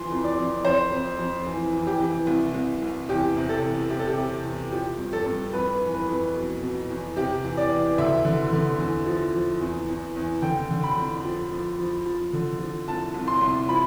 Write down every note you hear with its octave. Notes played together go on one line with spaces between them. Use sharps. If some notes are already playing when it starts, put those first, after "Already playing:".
Already playing: E3 F3 C6
F2
D5
F2
F2 C5
F2
F2
E3
E3
G4
E3
C2
C2
C2
E2 G4
C3
A4
E2
C3 G4
A4
G4
C3
E2
F3 G4
G2
A4
G2
F2 B4
E3
B4
F2
B2
B2
E2
C3 G4
E3
D5
E3
D2 E5
D3
D3
E2
F3
F3
E2
E2
E2
D3 G5
D3
B5
F2
F3
F3
F3
F3
D3
F3
C2 A5
C2
C6
C2
F3 B5